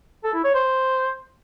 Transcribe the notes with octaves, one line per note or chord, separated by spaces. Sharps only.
A4
E4
C#5
C5